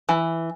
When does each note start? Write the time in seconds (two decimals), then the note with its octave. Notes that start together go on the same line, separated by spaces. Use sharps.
0.09 E3